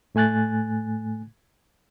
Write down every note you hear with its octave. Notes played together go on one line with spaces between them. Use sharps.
A2 A3 G#5 F#6 A6